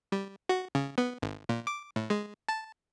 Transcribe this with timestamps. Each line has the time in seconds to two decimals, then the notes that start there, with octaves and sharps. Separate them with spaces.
0.12 G3
0.49 F#4
0.75 C#3
0.98 B3
1.22 G#1
1.49 A#2
1.67 D6
1.96 A2
2.10 G#3
2.49 A5